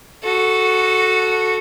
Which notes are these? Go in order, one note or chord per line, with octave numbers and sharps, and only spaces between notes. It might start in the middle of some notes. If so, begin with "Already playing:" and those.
F#4 A4